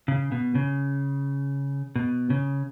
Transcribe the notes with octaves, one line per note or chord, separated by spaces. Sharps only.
C#3
B2
C#3
B2
C#3